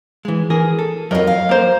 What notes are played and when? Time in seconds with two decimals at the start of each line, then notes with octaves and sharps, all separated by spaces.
0.25 E3 G#3
0.50 E3 G#4 A#4
0.79 A4
1.11 F2 F3 F#3 A#4 D#5
1.27 F5
1.49 A#3 C5